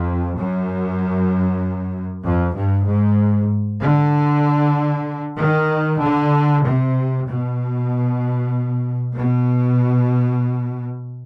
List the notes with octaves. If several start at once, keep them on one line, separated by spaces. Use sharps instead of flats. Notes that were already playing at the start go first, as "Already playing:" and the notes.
Already playing: F2
F#2
F2
G2
G#2
D3
D#3
D3
C3
B2
B2